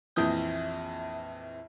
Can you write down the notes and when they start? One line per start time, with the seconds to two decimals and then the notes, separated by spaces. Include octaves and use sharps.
0.16 A#1 F2 E3 D#6 G6